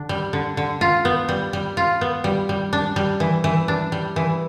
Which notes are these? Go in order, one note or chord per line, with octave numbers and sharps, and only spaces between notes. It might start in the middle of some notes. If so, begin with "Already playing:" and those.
Already playing: D3 D4
G3
D3
D3
F4
B3
G3
G3
F4
B3
G3
G3
D4
G3
E3
E3
D4
G3
E3